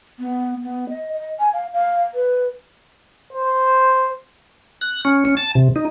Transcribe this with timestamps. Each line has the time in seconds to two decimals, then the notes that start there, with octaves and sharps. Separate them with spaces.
0.19 B3
0.63 B3
0.89 D#5
1.13 D#5
1.39 G#5
1.53 F5
1.73 F5
2.14 B4
3.33 C5
4.81 F#6
5.05 C#4
5.25 C#4
5.37 A5
5.55 C3
5.76 D#4